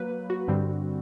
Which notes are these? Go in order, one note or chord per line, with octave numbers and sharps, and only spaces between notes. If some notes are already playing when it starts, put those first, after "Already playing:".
Already playing: F#3 A#3 B4
F#4
G2 D3 G3 C4